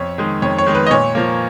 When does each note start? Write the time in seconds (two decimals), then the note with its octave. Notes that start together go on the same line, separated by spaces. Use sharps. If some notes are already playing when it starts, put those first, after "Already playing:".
Already playing: F2 C#5
0.18 D#3 G#3
0.42 F2 C#5
0.58 C#5
0.66 D#3 G#3
0.75 B4
0.87 D#5
0.91 A#2 C#5
1.15 F3 A#3